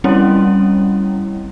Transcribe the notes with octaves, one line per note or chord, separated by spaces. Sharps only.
G3 A3 C4 C#4 E4